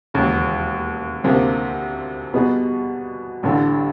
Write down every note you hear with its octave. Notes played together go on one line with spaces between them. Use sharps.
E1 D#2 C#3
D2 C3 F3 A#3
B2 G3 B3 D#4 G#4
A1 G2 D3 G3